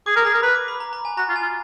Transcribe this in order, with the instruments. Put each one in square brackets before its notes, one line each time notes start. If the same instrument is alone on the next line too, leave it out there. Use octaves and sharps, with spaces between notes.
[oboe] G#4 [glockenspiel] D6
[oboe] A#4
[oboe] G#4 [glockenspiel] A#5
[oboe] A#4
[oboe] B4 [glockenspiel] B5
[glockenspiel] D6
B5
A#5
A#5
G#5
[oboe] F#4 [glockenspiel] A#5
[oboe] F4
[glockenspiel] G#5
[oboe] F4